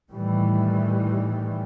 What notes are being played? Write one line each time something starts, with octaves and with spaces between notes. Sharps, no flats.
A2 D#3 E3 G3